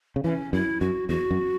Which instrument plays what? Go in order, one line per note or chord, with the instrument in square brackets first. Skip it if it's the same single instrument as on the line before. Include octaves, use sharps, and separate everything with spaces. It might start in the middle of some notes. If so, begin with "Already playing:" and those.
[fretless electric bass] C#3
[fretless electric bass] E3 [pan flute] C#4
[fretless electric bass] F#2 [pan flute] E4
[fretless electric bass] F#2 [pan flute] F#4
[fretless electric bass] E2 [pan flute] F#4
[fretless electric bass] F#2